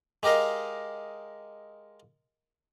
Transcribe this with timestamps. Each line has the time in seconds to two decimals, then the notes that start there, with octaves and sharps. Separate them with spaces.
0.23 G#3 G4 A#4 D#5 F5